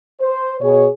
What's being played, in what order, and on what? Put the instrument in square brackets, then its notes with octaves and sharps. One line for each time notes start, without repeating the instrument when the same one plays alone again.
[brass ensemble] C5
B2 G#4 C#5